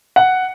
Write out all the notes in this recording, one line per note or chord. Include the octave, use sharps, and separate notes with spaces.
F#5